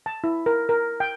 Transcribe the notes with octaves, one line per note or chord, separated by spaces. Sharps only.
A5
E4
A#4
A#4
G5